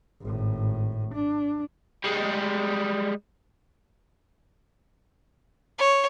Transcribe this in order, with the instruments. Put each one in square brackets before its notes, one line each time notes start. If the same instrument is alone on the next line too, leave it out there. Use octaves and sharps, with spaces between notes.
[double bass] G#1 A2
D4
[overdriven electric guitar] G3 G#3
[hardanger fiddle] C#5